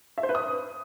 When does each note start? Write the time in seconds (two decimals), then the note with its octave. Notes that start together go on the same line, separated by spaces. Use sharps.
0.18 E5
0.23 C5
0.29 B4
0.35 D#6